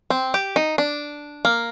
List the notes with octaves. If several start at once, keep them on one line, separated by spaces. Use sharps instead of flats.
C4
G4
D#4
D4
A#3